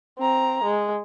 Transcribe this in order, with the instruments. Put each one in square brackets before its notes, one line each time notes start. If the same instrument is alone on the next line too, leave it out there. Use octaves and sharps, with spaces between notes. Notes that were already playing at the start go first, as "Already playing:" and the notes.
[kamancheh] C4 A#5
G#3